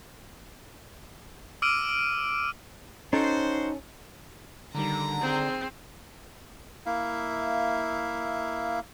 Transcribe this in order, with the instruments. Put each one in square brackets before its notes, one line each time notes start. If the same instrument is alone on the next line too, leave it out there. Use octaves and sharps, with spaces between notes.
[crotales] D6 E6 F6 D7 D#7
[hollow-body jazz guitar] C#4 A4 [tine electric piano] D#4 [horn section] F#4 C5
[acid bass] D3 [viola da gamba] D#3 G3 [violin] A#5
[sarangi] C4 [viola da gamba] G#4
[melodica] A#3 E4 E5 F5